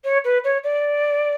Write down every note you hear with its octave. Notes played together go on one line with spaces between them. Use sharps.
C#5
B4
C#5
D5